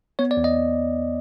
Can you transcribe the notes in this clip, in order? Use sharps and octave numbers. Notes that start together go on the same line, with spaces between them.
B3 C#5
D5
E2
D#5